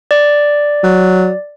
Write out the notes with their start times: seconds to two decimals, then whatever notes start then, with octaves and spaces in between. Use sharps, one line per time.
0.11 D5
0.83 F#3